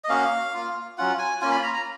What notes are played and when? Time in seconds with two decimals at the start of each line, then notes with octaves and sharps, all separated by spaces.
0.04 D#5
0.09 A#3 C#4 F#4 F5
0.54 A#3 F4
0.98 F#3 C#4 F4 F#5
1.19 G#5
1.41 A#3 C#4 F4 G#5
1.52 B5
1.63 A#5
1.74 A#5